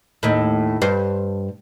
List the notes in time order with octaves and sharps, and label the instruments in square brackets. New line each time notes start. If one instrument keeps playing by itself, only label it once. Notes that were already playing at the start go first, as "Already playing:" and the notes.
[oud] D#2 A2
G2 C5